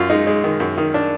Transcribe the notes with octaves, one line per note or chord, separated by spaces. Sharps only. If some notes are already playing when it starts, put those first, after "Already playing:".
Already playing: F#2 F4
G#3 D#4
G#3
D#3
F#2
D#3
D4